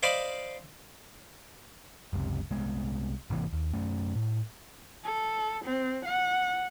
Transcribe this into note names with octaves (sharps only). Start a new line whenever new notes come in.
C5 D5 D#5 F5 B5 C6
F#1 C#2 C3
C2 G#3 B3
G#1 C3 E3 A#3
D#2
F#2 A3 C#4
A2
A4
C4
F#5